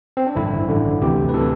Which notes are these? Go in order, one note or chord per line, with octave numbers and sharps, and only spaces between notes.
C4
D4
A1 G2 D3 E4
A1 G2 D3
D2 C3 E3 G4
B4
C3 E3 A4